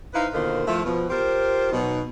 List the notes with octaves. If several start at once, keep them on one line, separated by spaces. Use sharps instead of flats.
D#4 E4 B4 C5 F5
B2 D3 D#3 A#3 F4 C5
F3 A3 E4 F4 E5
B2 F3
F4 G4 A#4 C5
B2 F#3 D#4